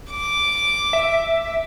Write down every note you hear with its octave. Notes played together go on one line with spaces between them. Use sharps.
D6
E5